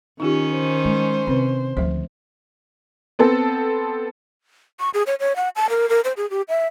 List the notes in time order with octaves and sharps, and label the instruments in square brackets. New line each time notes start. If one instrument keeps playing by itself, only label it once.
[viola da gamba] D#3 C#4 [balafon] D#4 F4 G4
[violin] C5
[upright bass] G#3
[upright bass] C3 [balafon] C4 B4
[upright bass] D2 D#3 [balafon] F3 C5
[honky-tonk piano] B3 C4 A4
[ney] C#6
G#4
C#5
C#5
F#5
A5
A#4
A#4
C5
G#4
G4
E5